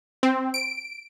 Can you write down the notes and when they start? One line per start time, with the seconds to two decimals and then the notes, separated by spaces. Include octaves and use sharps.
0.23 C4
0.54 D7